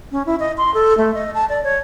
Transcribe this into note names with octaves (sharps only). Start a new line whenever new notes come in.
C#4
E4
D#5
C6
A4
A3
D#5
A5
D5
C#5